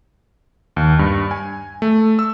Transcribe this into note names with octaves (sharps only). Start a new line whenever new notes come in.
D#2
G2
G#5
A3
E6